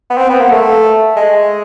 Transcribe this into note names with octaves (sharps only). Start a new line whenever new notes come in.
B3
C4
B3
A#3
A3
G#3